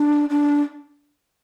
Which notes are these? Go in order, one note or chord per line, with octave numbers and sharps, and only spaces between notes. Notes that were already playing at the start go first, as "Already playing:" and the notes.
Already playing: D4
D4